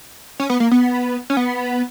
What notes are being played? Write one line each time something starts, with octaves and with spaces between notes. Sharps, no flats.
C#4
B3
A#3
B3
C#4
B3